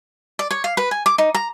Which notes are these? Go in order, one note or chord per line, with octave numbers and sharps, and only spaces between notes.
D5
C#5
F5
B4
G#5
D6
D#4
A#5